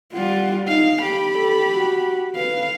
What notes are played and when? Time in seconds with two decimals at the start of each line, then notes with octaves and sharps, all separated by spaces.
0.13 G3 F4 F#5
0.68 D#4 F5
1.02 G4 B5 D7
1.35 A4
1.74 F#4
2.36 B4 F5